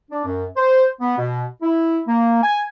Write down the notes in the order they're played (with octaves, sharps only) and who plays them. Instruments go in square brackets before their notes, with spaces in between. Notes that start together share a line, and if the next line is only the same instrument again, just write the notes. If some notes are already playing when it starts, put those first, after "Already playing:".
[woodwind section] D4
F#2
C5
B3
B2
E4
A#3
G#5